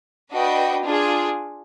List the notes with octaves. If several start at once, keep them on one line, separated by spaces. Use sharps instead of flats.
D4 F#4 B4 D#5 G5
D4 F4 G#4